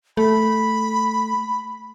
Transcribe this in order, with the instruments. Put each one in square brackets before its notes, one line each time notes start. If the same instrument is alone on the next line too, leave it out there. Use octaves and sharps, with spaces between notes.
[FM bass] A3 [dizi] B5